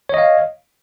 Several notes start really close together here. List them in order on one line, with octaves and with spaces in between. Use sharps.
C#5 D#5 F5